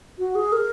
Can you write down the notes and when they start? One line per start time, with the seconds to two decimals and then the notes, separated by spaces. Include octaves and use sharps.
0.19 F#4
0.35 G#4
0.52 A#4